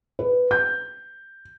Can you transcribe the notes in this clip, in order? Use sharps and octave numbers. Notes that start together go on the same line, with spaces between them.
B4
G6